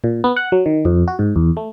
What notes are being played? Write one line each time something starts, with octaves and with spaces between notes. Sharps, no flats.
A#2
B3
F#5
F#3
D#3
F2
F#4
G#2
E2
A3